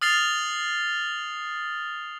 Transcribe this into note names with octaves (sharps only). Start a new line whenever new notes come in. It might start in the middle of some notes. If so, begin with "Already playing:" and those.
D#6 F6 A6 C7 F7 G7